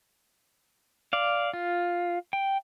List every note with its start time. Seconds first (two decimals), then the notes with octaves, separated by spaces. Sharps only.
1.13 D5 F5
1.53 F4
2.33 G5